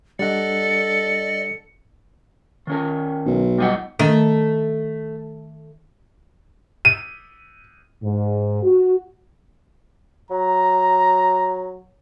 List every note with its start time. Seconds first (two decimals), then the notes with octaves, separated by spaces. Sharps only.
0.19 G3 D4 A4 D5 D#5 F#5 C#7
2.67 D#3 C#4 A#4
3.26 B1
3.58 G3 D#5 F#5
3.99 D#3 A3
6.85 D#7
8.03 G#2
8.63 F#4
10.31 F#3 A#5